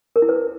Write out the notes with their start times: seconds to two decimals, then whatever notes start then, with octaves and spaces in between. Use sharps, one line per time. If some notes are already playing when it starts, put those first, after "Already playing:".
0.16 A#4
0.22 E4
0.29 B4